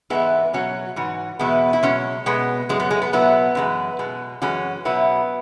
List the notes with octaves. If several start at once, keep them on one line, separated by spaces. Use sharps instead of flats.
G#2 E3 G#3 B3 E4
B2 F#3 C#4 F#4
G#2 E3 F#4
E2 B2 G#3 B3 E4
E4
B2 F#3 G#3 C#4
B2 G#3 B3
F#2 F#3 G#3
B3
G#3
B3
B2 F#3 B3 E4
F#2 E3 G#3
B2 G#3
F#2 E3 G#3 C#4 F#4
B2 F#3 B3 E4